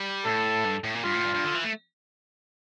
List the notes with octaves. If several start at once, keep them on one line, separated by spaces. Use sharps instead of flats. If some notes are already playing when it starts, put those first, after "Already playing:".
Already playing: G3
A2 A4
G2
A2
A#2
G2 F4
A2
G2
G2
D3
E3
A3